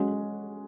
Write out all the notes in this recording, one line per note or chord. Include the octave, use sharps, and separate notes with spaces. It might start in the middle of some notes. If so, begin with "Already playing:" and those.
Already playing: G#3 C#4 F#4